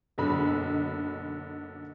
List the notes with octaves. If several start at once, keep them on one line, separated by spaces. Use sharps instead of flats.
F#1 B1 D3 B5